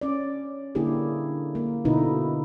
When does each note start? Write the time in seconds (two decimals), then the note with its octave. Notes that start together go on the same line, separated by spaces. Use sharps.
0.01 C#4 D5
0.75 D3 A#3 D4 E4 G4 G#4
1.55 A#3
1.85 B2 D3 D#4 E4 B4